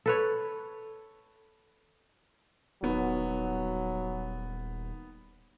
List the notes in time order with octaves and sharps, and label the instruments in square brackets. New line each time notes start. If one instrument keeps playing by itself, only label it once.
[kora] A4 B4 C#5
[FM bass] D#1 [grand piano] D#3 B3 [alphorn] F#3